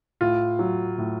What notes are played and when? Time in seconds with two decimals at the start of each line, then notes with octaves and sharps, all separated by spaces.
0.21 A2 F4
0.59 F#3
0.98 A2